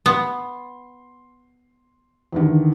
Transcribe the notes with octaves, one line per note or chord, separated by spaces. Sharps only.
B3 C6
E2 D3 D#3